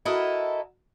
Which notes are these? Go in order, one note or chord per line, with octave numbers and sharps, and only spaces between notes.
E4 F#4 A4 A#4 D#5